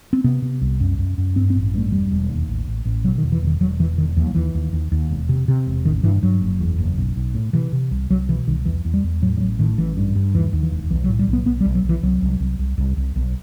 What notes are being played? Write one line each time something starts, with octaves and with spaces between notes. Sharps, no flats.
C4
C3 B3
C3
C2
F#2
F#2
F#2
G2 C4
C4
A1
G2 A3
E1 G3
E1
D#2
A1
A1
A1
B2 F#3
D#3
E2
E3
E1 D#3
E1 F#3
E2 E3
E1 D#3
D#2 E3
F#3
D#2 E3
D#2
D#2
D#2
E1
C3
C3
E1
A1 D#3
G2 E3
G2 F#3
F#1
E2
F#1
B1
B1
A2
C3 E3
C3
C2
C2 F#3
B2 E3
C2 D#3
E2 E3
E2
G3
E2
A2 F#3
G3
A1 F#3
A2 D#3
A1 E3
G2
G2
D#2 E3
D#2
E3
E1
B1 E3
F#3
A2
G3
B1
B3
B1 B3
G3
B1
F#3
B1
E3
C2 F#3
C2
C2
C2
C2
C2
B1